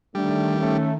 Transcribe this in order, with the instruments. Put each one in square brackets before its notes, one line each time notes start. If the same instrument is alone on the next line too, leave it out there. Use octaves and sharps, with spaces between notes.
[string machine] D#3 [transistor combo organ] G3 [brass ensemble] A3 D4
[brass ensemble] A3 C#4